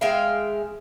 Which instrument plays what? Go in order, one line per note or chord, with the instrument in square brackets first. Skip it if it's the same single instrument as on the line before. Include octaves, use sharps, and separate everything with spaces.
[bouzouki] G#3 E5 F5 G5